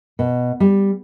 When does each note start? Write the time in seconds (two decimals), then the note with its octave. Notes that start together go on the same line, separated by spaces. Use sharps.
0.19 B2
0.60 G3